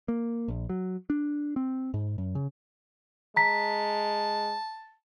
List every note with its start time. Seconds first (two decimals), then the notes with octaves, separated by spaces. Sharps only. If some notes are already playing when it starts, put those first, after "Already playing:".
0.08 A#3
0.48 A#1
0.69 F#3
1.10 D4
1.56 C4
1.94 G#2
2.18 F#2
2.35 C#3
3.36 G#3 A5 A#5 B6